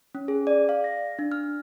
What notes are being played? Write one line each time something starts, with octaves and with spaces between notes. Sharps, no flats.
C#4
G#4
D5
F5
A#6
D4
F6